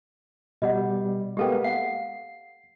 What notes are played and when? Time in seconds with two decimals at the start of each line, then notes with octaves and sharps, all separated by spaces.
0.62 B2 G3 D#5 F#5
1.37 G#3 A#3 B3 G4 A4 G5
1.64 F5 F#5 C7